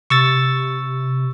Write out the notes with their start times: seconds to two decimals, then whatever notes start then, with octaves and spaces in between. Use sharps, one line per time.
0.10 C3 C#6 E6 A6